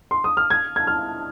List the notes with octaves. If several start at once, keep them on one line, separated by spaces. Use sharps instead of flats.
C6
D#6
F6
G#6
G#6
F6